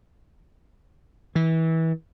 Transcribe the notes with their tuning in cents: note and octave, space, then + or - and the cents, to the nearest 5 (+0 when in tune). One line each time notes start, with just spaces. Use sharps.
E3 -25